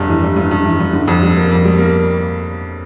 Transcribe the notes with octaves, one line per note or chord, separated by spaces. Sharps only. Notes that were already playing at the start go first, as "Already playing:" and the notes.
Already playing: F1 G2
E3
G2
G2
G2
E3
G2
D3
F2
G3
A#3
F2
G3
A#3